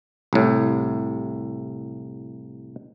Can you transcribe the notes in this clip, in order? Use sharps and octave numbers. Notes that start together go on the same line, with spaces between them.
C2 A2